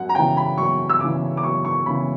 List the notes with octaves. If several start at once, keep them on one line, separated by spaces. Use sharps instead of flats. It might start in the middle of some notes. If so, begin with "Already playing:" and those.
Already playing: F#2 F#5
A#5
C#3 E3 G5
B5
F#2 C#6
E6
C#3 E3 D6
D6
F#2 C#6
C#6
C#3 E3 B5